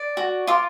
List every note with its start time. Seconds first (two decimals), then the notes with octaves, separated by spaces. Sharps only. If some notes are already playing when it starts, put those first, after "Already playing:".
Already playing: D5
0.17 F#4
0.47 F4 D6